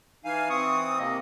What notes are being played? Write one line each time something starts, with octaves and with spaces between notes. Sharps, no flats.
E3 D#4 F5 G#5
E3 C4 C#6 D#6
C3 A#3 D#5